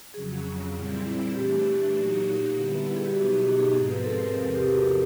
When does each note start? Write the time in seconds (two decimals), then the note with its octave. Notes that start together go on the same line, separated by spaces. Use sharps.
0.14 F2 C#3 F#3 G#4
0.74 A#2 G3 C4 E4
1.34 E3 A3 D4 G4
1.94 A#2 F#3 A#3 D#4 F#4
2.55 D3 G3 B3 E4
2.96 G#4
3.05 G4
3.14 B2 F#3 B3 D#4 F#4
3.29 G4
3.44 G4
3.60 G#4
3.74 G#2 F3 G#3 C4 G#4
3.89 B4
4.04 A4
4.20 A#4
4.35 E2 C3 F3 A4
4.55 G4
4.74 F#4